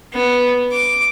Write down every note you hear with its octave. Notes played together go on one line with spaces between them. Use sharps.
B3
D6